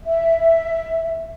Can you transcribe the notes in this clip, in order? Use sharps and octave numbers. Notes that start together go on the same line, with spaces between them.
E5